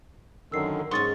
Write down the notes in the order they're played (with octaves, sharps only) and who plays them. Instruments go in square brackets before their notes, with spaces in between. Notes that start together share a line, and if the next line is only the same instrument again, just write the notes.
[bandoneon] F#2 D3 D#3 [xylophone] E6 C7
[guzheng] G#2 C#4 [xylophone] C6 D#6 A6 [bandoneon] C#6